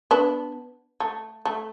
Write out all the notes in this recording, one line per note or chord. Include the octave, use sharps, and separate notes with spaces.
B3 D4
A3
A3